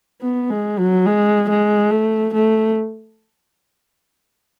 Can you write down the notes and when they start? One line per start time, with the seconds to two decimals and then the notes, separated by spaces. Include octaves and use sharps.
0.21 B3
0.50 G#3
0.79 F#3
1.06 G#3
1.49 G#3
1.91 A3
2.34 A3